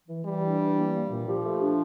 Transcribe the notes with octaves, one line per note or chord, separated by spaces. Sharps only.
E3
E3 G3
D4
E3
A#3
A#3
A#2
F3 G4
A3
D4